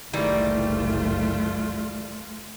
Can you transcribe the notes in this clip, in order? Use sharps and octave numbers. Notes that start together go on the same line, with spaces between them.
F#1 C2 D#3 E3 G3 A3 F4